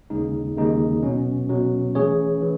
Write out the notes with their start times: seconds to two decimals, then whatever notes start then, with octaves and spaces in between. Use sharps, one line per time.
0.10 D#2 C#3 G#3 D#4
0.57 D#2 C#3 G#3 D#4
1.02 B2 F#3 C#4
1.49 B2 F#3 C#4
1.95 E3 A3 C#4 G#4 C#5
2.42 E3